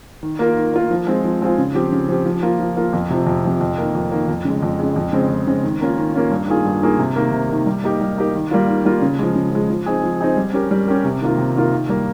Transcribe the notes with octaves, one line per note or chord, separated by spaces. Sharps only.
D#3
A#3 F4 A#4
D#3
A#3 F4 A#4
F3
G#3 C4 F4 G#4
F3
G#3 C4 F4 G#4
C#3
F3 C4 G4
C#3
F3 C4 G4
F3
A#3 F4
F3
A#3 F4
F2
C3 F3
F2
C3 F3
F2
D#3 A#3
F2
D#3 A#3
F2
C#3 G#3
F2
C#3 G#3
F2
C#3 G#3 C4
F2
C#3 G#3 C4
D#3
A#3 C#4 F4
D#3
A#3 C#4 F4
G2
D#3 A#3 F4 G#4
G2
D#3 A#3 F4 G#4
C3
D#3 A#3
C3
D#3 A#3
G3
A#3 D#4 G4 A#4
G3
A#3 D#4 G4 A#4
D#3
G3 A#3 F4
D#3
G3 A#3 F4
C#3
F3 G#3
C#3
F3 G#3
F3
C4 D#4 G#4
F3
C4 D#4 G#4
G3
C#4 G4 A#4
G3
C#4 G4 A#4
C3
D#3 A#3 F4 A#4
C3
D#3 A#3 F4 A#4
D#3
G3 A#3